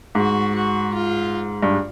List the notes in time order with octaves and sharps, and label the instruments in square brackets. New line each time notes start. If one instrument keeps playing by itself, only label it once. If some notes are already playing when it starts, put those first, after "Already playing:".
[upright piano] G#2 [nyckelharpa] F#4
[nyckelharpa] F#4
F4
[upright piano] G2